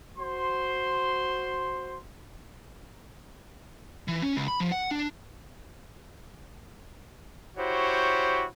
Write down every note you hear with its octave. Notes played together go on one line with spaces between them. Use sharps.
F#4 C5 C6
E3
C#4
C#2
B5
F3
F#5
D4
E4 F#4 G4 C5 C#5